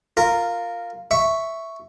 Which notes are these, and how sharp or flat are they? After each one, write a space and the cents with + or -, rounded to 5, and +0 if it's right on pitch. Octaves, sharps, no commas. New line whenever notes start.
F4 +0 A#4 -15
E5 +0 C#6 +0